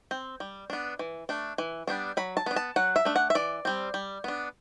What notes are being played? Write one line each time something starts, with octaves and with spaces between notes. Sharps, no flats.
C4
G3
B3 D4
E3
A3 D4
E3
G3 B3 D4
F#3 B5
A5
B3 D4
A5
F#3 F#5
E5
A3 D4
F#5
E5
E3 D5
G3 C4
G3
B3 D4